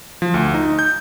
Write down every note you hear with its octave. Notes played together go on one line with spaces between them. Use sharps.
F3
D2
D#4
G6